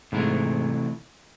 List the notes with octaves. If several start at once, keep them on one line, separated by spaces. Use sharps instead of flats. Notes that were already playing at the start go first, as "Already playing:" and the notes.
G#2 C3 E3 A3